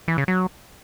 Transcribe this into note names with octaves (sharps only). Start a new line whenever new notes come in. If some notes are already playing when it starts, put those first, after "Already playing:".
E3
C#3
F#3